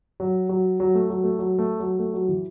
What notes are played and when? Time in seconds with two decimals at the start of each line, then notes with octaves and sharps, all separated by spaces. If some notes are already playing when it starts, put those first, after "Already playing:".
0.20 F#3
0.49 F#3
0.80 F#3
0.95 A3
1.10 F#3
1.24 A3
1.39 F#3
1.59 A3
1.80 F#3
1.99 A3
2.14 F#3
2.28 E3